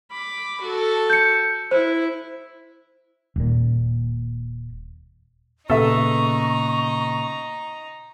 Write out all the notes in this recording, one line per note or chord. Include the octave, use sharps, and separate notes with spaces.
B5 D6
F#4 A4
G6 C#7
E4 C5
D#1 A#2
A#2 C#3 B3 D#4 A4 E5 A#5 C#6